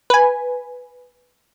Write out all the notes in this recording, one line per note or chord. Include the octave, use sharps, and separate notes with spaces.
B4 G#5